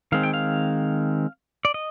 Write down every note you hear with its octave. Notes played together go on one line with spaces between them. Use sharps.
D#3 G#3 C4 F5
G5
F5
D5
D#5